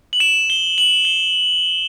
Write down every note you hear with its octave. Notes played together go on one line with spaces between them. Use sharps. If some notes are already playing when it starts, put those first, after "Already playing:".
F#7
E7
G7
F#7
G7